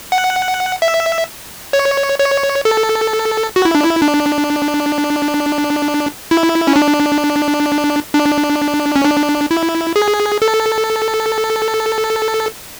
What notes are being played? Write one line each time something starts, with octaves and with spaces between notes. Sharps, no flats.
F#5
E5
C#5
C#5
A4
F#4
E4
D4
E4
D4
E4
C#4
D4
D4
C#4
D4
E4
G#4
A4